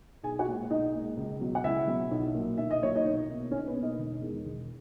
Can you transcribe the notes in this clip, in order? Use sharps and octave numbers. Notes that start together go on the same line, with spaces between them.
B1 G#4 G#5
F#4 F#5
A#2 G#3
B1 D#4 D#5
A#2 G#3
C#2
B2 F#3
F#5
C#2 E4 E5
B2 F#3
B1
A#2 F#3
B1 E5
D#5
A#2 F#3 C#5
D#4 D#5
B1
B2 A#3
B1 C#4 C#5
B3 B4
B2 A#3
D#4 D#5
E1
E2 D#3 G#3
E1